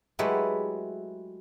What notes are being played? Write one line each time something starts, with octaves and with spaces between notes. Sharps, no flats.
F#3 G#3 A3 E4 G4 B4